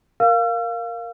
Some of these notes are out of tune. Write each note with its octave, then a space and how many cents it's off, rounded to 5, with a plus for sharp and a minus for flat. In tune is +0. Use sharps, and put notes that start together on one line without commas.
A#4 +0 F5 +0 E6 +45